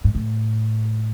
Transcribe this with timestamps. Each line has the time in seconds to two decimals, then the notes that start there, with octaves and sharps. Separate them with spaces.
0.04 G#2
0.15 A2